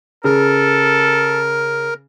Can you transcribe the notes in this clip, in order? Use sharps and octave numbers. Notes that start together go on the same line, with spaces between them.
C#3 A4 A#4